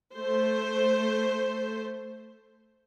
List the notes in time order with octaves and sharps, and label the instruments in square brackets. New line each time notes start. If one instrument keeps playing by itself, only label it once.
[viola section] A3 C5